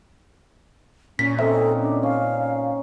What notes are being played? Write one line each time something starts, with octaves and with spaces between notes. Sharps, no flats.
A#2 C#4 B6
C4 C#4 D#4 A4 E5
D4
C#4 F5